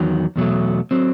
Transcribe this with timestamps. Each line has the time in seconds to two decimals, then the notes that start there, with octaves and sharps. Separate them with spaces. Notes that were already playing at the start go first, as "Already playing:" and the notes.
Already playing: E2 D#3 F#3
0.36 E2 B2 F#3 A3
0.91 F#3 C4